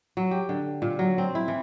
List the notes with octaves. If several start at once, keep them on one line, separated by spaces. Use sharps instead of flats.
F#3
G4
D3
A#2
F#3
C4
E4
E3